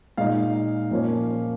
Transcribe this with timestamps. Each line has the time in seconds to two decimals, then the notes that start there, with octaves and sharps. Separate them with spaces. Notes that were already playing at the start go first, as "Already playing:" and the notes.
0.17 A#2 G#3 D#4 F5
0.91 A#2 F3 A#3 C#4